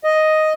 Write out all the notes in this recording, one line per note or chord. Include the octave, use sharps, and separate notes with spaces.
D#5